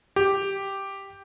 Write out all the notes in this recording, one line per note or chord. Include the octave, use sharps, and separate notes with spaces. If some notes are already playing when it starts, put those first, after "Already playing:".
G4